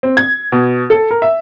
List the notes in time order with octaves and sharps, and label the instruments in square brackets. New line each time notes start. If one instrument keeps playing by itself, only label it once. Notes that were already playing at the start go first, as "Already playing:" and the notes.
[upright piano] C4
G#6
B2
A4
A#4
E5